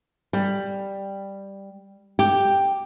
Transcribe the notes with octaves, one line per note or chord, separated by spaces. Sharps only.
G3
G4